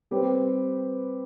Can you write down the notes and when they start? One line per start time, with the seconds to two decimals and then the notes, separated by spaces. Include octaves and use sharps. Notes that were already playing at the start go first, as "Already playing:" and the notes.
0.11 G3 C4 G4 B4